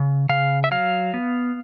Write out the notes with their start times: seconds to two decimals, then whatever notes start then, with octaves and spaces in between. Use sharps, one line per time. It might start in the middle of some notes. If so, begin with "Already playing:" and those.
Already playing: C#3
0.29 C#3 F5
0.64 E5
0.71 F#3 F5
1.14 B3